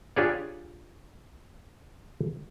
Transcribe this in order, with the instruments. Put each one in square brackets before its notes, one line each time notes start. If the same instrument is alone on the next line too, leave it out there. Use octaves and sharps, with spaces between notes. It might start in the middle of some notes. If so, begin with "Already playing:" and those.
[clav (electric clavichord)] D4 F4 G4 G#4 C#5 D5